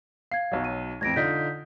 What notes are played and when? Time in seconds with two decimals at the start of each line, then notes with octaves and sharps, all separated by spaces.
0.32 F5 G#6 C7
0.52 B1 F#3
0.64 D#7
1.01 A1 F2 G#6 A#6 D7
1.16 D3 D#4 F4 G6 B6